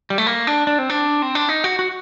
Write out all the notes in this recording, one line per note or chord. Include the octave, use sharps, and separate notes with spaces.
G3
A3
A#3
D4
D4
C4
D4
C4
D4
D#4
F#4
F#4